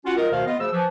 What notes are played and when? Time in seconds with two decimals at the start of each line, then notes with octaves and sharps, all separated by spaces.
0.05 C#4 F4 F#4 F#5
0.17 F4 A#4 D#5
0.31 D2 B2 D#3 A#4 C5 F5
0.46 B3 F4 D#5
0.59 D2 C#3 F3 E6
0.72 E3 F3